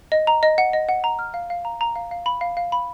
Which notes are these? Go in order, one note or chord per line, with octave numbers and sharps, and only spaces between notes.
D#5
A#5
D#5
F#5
D#5
F#5
A#5
F6
F5
F5
A#5
A#5
F5
F5
B5
F5
F5
B5